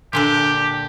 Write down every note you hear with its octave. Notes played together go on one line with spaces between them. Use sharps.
A#2 D3 D4 G4